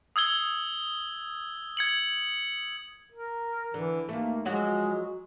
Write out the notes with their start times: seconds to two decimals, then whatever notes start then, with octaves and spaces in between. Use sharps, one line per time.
0.16 D#6 E6 G#6 G7
1.77 G#6 C#7 F#7
3.12 A#4
3.74 D3 E3
4.09 D#2 A3 A#3
4.45 F3 F#3 G#3 F#4